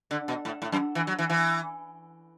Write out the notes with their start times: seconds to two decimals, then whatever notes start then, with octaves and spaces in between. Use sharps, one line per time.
0.11 D3
0.28 B2
0.45 A2
0.62 A2
0.72 F#2
0.95 E3
1.07 F#3
1.19 E3
1.30 E3